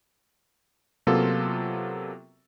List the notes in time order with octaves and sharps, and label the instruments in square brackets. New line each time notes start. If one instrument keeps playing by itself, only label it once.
[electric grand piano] C3 F#3 A#3 B3 F4 A4